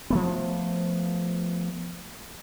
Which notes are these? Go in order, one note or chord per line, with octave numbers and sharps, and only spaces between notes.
F3 A3 B3